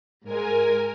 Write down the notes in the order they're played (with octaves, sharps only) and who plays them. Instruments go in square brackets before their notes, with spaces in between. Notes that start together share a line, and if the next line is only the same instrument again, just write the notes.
[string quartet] G#2 G#3 [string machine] A#4 G#5